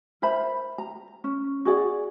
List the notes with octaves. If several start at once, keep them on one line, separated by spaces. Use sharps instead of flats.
A#4 C5 E5 B5
A#5
C#4
F#4 G#4 D5 F#5